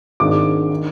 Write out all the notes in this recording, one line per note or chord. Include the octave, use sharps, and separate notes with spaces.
G#1 G#2 D#3 G#3 D4 D6
D#3